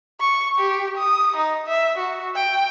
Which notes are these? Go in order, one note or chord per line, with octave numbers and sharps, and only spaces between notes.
C#6
G4
D#6
D#4
E5
F#4
G5